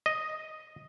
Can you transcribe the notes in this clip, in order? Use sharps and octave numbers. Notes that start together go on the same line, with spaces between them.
D#5